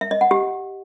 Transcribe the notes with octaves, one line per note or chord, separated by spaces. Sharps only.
E5
D#5
F#5
G4